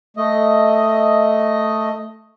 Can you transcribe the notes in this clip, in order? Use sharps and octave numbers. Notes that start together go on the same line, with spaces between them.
A3 D#5